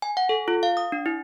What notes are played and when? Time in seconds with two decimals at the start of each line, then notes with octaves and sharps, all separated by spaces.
0.02 G#5
0.17 F#5
0.29 A4
0.48 F4
0.63 F5
0.77 D#6
0.92 D4
1.06 E4